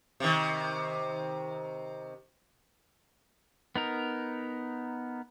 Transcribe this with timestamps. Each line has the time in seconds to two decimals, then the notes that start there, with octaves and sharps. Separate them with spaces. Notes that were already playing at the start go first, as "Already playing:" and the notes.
0.20 C3 D#3
3.76 B3 D#4 A#4